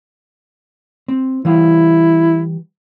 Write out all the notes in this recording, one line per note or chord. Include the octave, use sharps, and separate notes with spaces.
C4
E3 G3 E4 F5